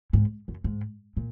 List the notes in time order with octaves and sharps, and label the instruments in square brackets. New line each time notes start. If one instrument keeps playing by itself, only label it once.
[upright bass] G#2
F#2
G#2
A#2